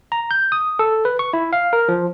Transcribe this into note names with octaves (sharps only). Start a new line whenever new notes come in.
A#5
G6
D#6
A4
B4
C#6
E4
F5
A#4
F3